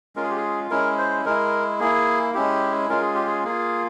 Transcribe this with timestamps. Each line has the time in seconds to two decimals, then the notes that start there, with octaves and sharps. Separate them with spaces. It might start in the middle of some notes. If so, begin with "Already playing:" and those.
0.16 G#3 C#4 F4 A#4
0.23 G#4
0.30 G4
0.37 G#4
0.70 G#3 C#4 E4 A#4
0.98 C5
1.25 G#3 E4 A#4
1.80 A#3 E4 G#4
2.34 G#3 C#4 E4 G4
2.89 G#3 C#4 F4 A#4
3.01 G#4
3.15 G4
3.27 G#4
3.45 A#3 F4 G#4